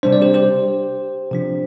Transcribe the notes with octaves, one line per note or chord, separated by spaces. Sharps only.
C3 G3 D4 C5
D5
G4 C5
G4 C5
C3 F3 D4